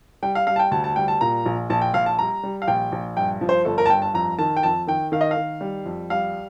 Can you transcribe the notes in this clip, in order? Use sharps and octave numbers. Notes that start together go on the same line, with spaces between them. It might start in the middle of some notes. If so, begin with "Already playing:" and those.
G3 G5
F5
G3 F5
A5
G5
D2 A5
A5
G3 G5
A5
A#2 A#5
A#1
A#1 A5
G5
A#1 F5
A5
G3 A#5
G3
F5
A#1 G5
A#1
G2 G5
F3
C5
G1 A4
A#4
A5
G2 G5
A5
F2 A#5
D#3 A5
G5
F2 A5
D#3 G5
D#3 F5
D#5
F5
D#3
G3
F2
G3 F5